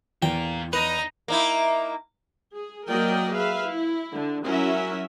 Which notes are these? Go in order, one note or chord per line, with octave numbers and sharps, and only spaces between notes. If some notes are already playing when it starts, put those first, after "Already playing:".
E2 F4 A#4 G5
D#4 B4 D#5 A#5
A#3 D#4 E4
G#4
F#3 A#3 A#4 D5 D#5 G5
G#4 B4 E5 F5
E4
D3
F#3 C#4 E4 F#4 A#4 E5